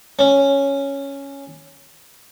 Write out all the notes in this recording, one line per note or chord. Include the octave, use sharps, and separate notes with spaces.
C#4